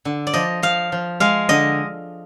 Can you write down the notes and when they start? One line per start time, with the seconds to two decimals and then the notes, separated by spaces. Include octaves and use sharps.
0.05 D3
0.27 D5
0.33 F3 D#5
0.63 F3 F5
0.92 F3
1.20 G#3 F5
1.49 D3 D#5